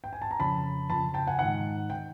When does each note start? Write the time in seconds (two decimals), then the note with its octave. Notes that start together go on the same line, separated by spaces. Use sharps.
0.04 G5
0.13 G#5
0.22 A5
0.31 A#5
0.39 F2 C#3 F3 A5 B5
0.90 F2 C#3 F3 A5 B5
1.14 G5 A5
1.27 F#5 G#5
1.39 G#2 D#3 F#5
1.90 D#3 G5